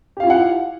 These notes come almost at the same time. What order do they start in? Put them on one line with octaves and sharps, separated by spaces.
G4 F5 F4 E4 F#5